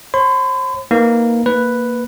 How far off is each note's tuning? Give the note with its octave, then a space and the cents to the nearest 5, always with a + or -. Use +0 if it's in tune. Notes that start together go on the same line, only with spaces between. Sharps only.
C5 +45 B5 +45
A#3 +0 D#4 +20 B4 +0
A#3 -5 B4 +0